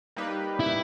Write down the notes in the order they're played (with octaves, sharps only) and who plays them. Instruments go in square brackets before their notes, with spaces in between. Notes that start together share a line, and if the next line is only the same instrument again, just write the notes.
[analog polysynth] G3 A#3 D#4 G4 B4
[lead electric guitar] E4